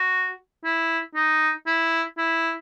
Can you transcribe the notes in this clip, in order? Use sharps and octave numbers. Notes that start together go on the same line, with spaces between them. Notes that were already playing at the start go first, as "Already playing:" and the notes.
Already playing: F#4
E4
D#4
E4
E4